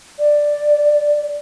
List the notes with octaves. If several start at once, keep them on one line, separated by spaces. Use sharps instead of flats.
D5